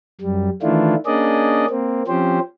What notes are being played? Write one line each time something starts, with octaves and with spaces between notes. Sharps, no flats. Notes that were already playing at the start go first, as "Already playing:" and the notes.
F#2 G3
D#3 E3 A3 D4 E4 F4
A#3 C#4 D4 G#4 D5 D#5
A#3 C4
F3 C4 C#4 G4 C5